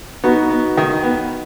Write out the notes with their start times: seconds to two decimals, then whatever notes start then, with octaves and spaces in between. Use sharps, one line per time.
0.24 B3 D#4 F#4
0.50 B3
0.77 D#3
1.03 B3